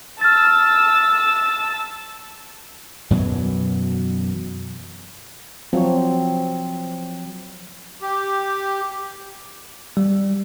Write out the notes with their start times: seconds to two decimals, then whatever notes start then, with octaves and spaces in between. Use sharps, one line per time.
0.21 A5 E6 F6 A6
3.10 F#2 B2 E3 F#3
5.73 F3 F#3 C4 C#5
8.02 G4
9.97 G3